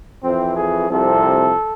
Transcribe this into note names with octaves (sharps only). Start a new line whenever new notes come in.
F2 E3 C4
G#4
C2 C3 F3 A4